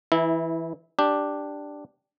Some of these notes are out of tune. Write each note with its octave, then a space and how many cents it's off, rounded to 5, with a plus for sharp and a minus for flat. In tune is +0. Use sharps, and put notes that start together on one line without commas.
E3 +0 E4 -25
D4 +0 G4 +0